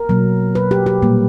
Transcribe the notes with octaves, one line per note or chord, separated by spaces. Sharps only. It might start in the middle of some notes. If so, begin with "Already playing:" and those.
Already playing: A#4
B2 F#3 A#3
B4
G4
G4
A#2 G3 A#3